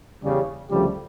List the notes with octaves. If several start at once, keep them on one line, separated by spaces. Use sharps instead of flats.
E2 C#3 G3
D2 C#3 F3 G3 A3 G4